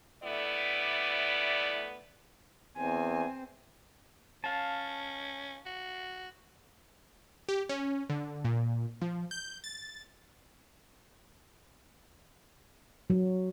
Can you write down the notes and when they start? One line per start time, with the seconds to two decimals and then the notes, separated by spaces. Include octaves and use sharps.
0.23 D2 A3 B3 E4 D5
2.77 E2 C4 G#5
4.44 C#4 F5 A5
5.66 F#4
7.49 G4
7.69 C#4
8.10 D3
8.45 A#2
9.02 F3
9.31 G6
9.64 A6
13.10 F#3